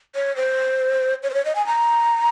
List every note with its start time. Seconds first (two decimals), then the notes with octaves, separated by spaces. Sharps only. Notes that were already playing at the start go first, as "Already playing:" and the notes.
0.15 C#5
0.36 C5
1.23 C#5
1.30 C5
1.34 C#5
1.45 D#5
1.55 G#5
1.67 A#5